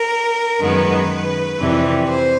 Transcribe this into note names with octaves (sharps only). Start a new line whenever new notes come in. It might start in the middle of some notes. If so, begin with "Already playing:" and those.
Already playing: A#4
F#2 D#3 G#3 B3 B4
F2 C3 E3 G3
C5